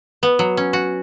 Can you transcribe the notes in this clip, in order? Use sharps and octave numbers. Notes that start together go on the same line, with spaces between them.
B3
F#3
C#4
F#4